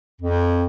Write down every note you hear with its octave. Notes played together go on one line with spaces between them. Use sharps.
F2